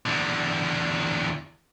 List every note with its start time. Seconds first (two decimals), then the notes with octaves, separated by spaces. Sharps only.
0.06 E2 D3